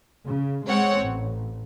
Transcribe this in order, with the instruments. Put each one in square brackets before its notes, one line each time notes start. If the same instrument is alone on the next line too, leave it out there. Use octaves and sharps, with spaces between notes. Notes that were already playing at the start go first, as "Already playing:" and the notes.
[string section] C#3
G#3 C4 C#5 F#5
A1